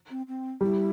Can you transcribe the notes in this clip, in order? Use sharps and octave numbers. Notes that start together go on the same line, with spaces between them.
C4
C4
G3 E4